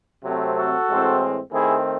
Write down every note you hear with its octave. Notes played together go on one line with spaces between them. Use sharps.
C3 F#3 A3 C4
F#4 A4
A2 E3 G#3 C4
D#3 A3 C4 E4 G#4